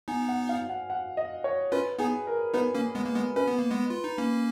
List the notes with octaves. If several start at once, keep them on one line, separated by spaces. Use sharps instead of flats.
B3 D#4 G#5
F#5
F5
F#5
F#5
D#5
C#5
C#4 F4 B4
B3 D#4 G#4
A#4
B3 D#4 B4
A#3 C#4
G#3 B3
A#3
G#3 B3
C#4 B4
B3
A#3
G#3 B3
F4
D#4
A#3 C#4